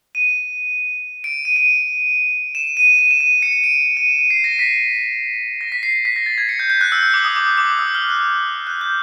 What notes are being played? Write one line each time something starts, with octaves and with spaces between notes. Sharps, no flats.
D#7
D7
D#7
D#7
E7
D#7
D#7
E7
D#7
C#7
C#7
D7
D7
D7
D#7
E7
D#7
C7
A#6
B6
A#6
B6
C7
C7
B6
A#6
A6
G#6
C#7
G6
G6
F#6
E6
E6
D6
D#6
D6
D#6
D6
D#6
E6
F6
F#6
F#6
G6